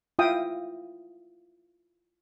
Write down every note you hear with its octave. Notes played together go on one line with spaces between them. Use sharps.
E4 F4 E5 F5 G5 D#6